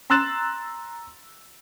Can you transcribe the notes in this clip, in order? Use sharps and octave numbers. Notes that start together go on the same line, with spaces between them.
A#5 C6 E6 F#6 A6 E7